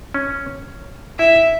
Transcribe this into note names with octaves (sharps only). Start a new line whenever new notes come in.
C#4
E4 E5